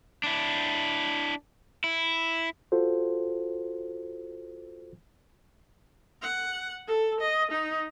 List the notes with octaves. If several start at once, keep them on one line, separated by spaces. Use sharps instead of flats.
D4 E4
E4
F4 F#4 A4 C5
F#5
A4
D#5
D#4